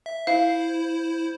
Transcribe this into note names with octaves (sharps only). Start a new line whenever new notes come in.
E5
E4 C5 F5